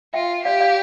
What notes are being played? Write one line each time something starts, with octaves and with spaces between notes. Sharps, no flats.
F4 E5 G5
G4 D5 F5
D5 F5